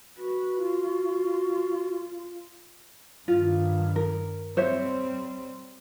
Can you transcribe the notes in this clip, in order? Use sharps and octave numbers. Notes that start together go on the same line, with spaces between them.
F#4 B4
F4
G2 D#3 F4
A#4
G3 C4 C5 C#5 E5